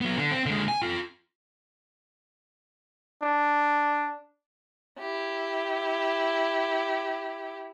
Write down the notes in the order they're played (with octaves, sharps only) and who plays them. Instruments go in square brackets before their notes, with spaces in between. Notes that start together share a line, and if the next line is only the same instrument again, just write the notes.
[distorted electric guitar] F#3 B3
D3
C4
D3 G#3
G#5
F4 A4
[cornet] D4
[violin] E4 G4